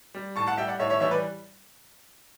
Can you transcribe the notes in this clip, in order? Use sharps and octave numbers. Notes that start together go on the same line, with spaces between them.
G3
A2 A5 C#6
F#5 A5
G3 E5 G5
D5 F#5
A2 C#5 E5
C#5 E5
E3 G3 C#5 E5
B4 D5